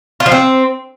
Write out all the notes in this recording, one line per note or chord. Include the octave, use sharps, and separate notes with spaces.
F4
F3
C4